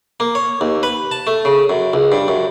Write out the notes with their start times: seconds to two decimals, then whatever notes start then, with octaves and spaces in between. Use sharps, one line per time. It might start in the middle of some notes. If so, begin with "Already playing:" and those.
0.20 A#3
0.35 C#5
0.61 D#2
0.83 B4
1.11 A5
1.27 A3
1.45 C#3
1.70 F#2
1.93 C#2
2.12 G2
2.28 F#2